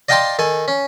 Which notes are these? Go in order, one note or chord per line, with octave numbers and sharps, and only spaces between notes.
D5 D#5 F5 G5 A5 C6
D#3 A4 G#5
C#4